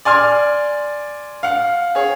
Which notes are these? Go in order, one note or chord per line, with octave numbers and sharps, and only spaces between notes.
D5 G#5 C6 F6
F5 F#5
G#4 C#5